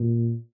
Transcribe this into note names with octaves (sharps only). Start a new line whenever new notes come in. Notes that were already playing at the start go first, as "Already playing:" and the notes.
Already playing: A#2